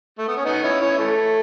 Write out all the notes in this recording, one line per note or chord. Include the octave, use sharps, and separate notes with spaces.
A3
B3
C#4
B3 D#4
C#4 E4
C#4 E4
E3 A3